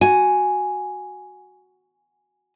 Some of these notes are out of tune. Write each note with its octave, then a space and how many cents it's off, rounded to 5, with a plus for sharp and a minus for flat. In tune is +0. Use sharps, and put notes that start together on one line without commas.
F#4 +0 G#5 +0